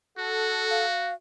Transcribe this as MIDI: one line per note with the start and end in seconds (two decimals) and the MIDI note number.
0.18 1.12 66
0.18 0.85 69
0.18 0.85 78
0.71 1.14 77